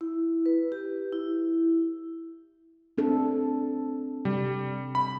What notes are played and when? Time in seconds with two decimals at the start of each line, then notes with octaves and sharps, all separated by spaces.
0.01 E4
0.46 B4
0.72 G4
1.12 E4
2.98 C4 D4 A4
4.25 C3 G3
4.95 B5